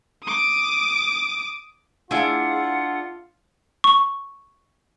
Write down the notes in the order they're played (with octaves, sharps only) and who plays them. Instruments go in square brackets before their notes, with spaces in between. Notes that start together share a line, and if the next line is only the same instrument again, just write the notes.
[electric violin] D6 D#6
[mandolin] D4 E4 [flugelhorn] F4 [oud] G#4 [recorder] F#5
[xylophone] C#6